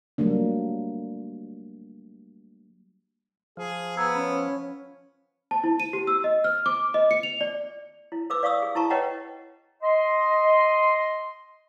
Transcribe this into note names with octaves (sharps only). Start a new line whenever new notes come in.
F#3 G3 A3 A#3 D4
F3 G#4
B3 A#5 E6 G#6
C#4 B5
A5
E4
D#7
G4
E6
D#5
F6
D6
D#5
C#7
F7
D5
E4
A4 B4 D6 E6
D5 F5 C#6 D#6 E6
G#4
E4 A5 A#5 C#6
B4 C#5 D#5 F#5 G5 A#5
D#5 C6